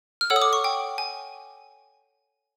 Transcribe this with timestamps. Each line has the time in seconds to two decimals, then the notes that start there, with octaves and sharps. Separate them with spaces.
0.21 F6
0.30 A4 C#5 F#5 E6
0.36 D#6
0.42 D6
0.53 C#6
0.64 G5
0.98 G#5